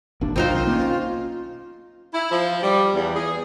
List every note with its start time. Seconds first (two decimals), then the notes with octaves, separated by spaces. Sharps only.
0.21 G#1 D#2 D4
0.36 C2 D#3 F#3 C4 D#4 F4 C5
0.50 B1
0.67 A#3 B3 C#4
2.14 E4
2.32 F3
2.63 G3
2.94 E2
3.16 G#4